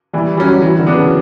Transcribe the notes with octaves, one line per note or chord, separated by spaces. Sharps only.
E3 G3
F#3 G3 C#4 F#4
E3 F#3
D3
B3 D4 F#4
C#3